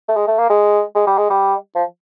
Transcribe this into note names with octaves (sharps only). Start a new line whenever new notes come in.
A3
G#3
A3
A#3
G#3
G#3
G3
G#3
G3
F3